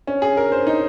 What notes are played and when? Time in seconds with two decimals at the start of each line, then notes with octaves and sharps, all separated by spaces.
0.07 C#4
0.22 G#4
0.37 A#4
0.52 C5
0.67 D#4